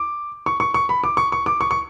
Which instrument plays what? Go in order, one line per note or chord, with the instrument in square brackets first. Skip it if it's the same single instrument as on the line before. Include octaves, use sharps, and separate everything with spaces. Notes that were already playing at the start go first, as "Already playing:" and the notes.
Already playing: [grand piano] D6
C#6
C#6
C#6
B5
D6
C#6
C#6
D6
C#6
C#6